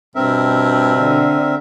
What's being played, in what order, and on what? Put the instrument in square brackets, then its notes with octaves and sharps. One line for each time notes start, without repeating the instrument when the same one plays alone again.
[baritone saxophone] G2 [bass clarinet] B2 [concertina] C4 A#4 E5
[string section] D3